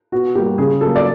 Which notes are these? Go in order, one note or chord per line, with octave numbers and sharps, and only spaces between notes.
B2 F#4
G3 A#3 G4
C#3 G#4
F#3 A#3 A4
D5